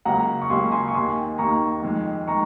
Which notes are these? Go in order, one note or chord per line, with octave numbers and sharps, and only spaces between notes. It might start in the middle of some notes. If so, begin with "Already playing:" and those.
C#2 C#3 F#3 A#3 F#5 A#5
C#6
C#2 C#3 F#3 A#3 G#5 C6
G#5 C6
C#6
D#2 D#3 A#3 G#5 C6
D#2 D#3 A#3 A#5 C#6
F2 D#3 G#3
D#3 G#3 A#5 C#6